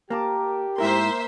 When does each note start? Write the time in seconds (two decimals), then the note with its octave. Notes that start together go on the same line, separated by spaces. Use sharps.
0.10 A#3 G4 A#4 A5 D6
0.78 G#2 A#3 E4 A#4 C5 E5 C6